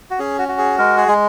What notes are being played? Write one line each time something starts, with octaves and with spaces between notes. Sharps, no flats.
F#4
C#4 G#4
F#4
F#4
G#4
G#3 A#4
G#4
G#3